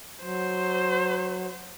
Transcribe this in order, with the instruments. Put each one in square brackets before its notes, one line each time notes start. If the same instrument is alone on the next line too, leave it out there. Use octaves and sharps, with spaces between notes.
[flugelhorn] F#3 [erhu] C5